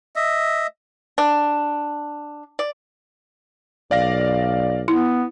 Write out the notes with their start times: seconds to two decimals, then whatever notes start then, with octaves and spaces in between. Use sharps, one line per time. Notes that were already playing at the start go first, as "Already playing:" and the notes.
0.16 D#5 E5
1.18 D4
2.59 D5
3.91 B1 D5 F5 A#6
4.88 B3 E4